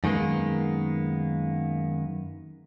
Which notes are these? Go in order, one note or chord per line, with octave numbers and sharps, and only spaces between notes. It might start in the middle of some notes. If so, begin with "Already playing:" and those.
F#2 D#3 G#3 A#3 B3